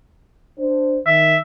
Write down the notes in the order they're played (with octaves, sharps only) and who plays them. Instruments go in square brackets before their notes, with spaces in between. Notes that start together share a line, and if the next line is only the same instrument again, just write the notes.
[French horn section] D4 C5
[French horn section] D#3 [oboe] E5